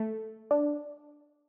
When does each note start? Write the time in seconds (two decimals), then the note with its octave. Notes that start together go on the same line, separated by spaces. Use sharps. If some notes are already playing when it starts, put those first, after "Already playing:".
Already playing: A3
0.51 D4